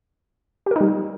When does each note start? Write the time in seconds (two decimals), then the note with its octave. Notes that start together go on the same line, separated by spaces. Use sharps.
0.66 G4
0.71 A#4
0.76 D#4
0.81 G3